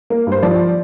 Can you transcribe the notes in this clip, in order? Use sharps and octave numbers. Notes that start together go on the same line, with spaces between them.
A#3
G2 C5
F3 D5